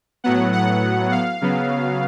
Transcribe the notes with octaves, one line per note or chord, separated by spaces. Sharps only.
A2 F#3 B3 F#5
F#5
F5
C#3 F#3 B3